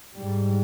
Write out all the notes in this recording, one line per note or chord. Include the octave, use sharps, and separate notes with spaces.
G#2 G3